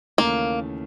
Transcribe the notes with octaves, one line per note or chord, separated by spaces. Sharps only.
D#2 C#3 E3 A3 A#3 C#4